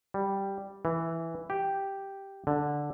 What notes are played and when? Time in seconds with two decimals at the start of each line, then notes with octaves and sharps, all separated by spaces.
0.14 G3
0.85 E3
1.50 G4
2.47 D3